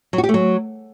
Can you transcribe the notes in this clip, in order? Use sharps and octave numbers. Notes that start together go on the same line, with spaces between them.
F#3
F#4
G4
A3
F#3